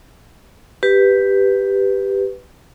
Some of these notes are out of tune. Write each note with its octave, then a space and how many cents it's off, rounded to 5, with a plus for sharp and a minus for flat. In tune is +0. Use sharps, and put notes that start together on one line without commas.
G4 +0 B4 +0